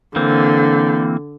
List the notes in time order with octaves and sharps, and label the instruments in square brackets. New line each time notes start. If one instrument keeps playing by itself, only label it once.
[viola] D3 [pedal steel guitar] E3 A#3 C4